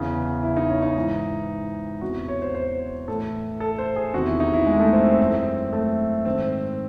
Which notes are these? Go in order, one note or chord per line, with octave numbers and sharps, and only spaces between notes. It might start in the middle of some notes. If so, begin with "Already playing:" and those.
Already playing: E2 C#3 E3
E4
D#4
C#4
D#4
G#2 E3
E2 C3 E3 F#4
C#5
C5
C5
A2 E3 A4
A4
C5
G#4
E2 C3 D#3 F#4
E4
D#4
E4
G#3
A3
C4
C4
F#2 E3
A3
G#2 D#3 C4